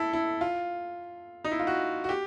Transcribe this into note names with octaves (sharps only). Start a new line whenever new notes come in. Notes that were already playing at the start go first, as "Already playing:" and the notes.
Already playing: E4 A4
E4
F4
D#4
E4
F4
F#4
F#4
G4